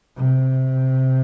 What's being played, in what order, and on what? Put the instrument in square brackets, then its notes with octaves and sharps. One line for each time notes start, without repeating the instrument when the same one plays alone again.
[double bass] C3